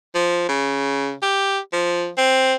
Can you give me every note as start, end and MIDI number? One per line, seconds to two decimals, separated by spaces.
0.15 0.48 53
0.49 1.14 49
1.22 1.59 67
1.73 2.09 53
2.18 2.55 60